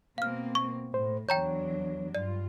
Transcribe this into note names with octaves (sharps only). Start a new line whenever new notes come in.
B2 A#3 C4 F5 F6
C#6
A2 C5
E2 F#3 D4 C#5 G5 A#5 G6
G2 F4 D5